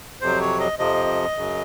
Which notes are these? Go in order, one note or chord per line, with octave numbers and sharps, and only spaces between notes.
F2 C3 F#3 C5
C#5
D#5
F2 C3 F3 D#5
F#2 C#3 F#3